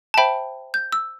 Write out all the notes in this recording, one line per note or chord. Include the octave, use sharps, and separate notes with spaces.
A5
C5 E5 G5 B5
G6
E6